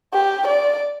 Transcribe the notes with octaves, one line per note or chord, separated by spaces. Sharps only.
G4
D5